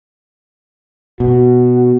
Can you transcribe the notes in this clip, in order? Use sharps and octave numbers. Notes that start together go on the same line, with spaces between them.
B2 F#4